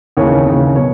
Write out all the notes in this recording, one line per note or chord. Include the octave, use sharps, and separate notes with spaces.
D#2 C#3 E3 C#5
D#2 C#3 E3
B2 F#3 C#5